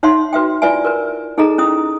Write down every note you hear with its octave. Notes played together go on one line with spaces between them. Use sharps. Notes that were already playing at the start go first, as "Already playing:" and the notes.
D#4 C#5 E5 F#5 C6
F#4 B4 E5 G5
E4 F4 B4 D5 E5 G#5
A#4 B4
D#4 G#4 A4 D#5 A#5
C#4 E4 D#6